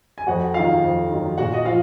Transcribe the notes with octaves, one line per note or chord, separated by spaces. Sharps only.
G#5
F2 F#4 F#5
D#3 F#3 F4 F5
F2
D#3 F#3
A#2 F#4 F#5
D#5
F3 F4 F5